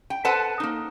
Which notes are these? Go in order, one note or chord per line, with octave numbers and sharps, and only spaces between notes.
G5
A4 B4 C5 F#5 A5
A#3 D#4